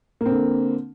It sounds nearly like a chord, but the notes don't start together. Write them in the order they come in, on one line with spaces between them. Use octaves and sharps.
A#3 C4 D3